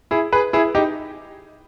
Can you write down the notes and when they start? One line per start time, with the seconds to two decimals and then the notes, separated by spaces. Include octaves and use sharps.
0.11 E4 G#4
0.32 G#4 B4
0.53 E4 G#4
0.75 D#4 G4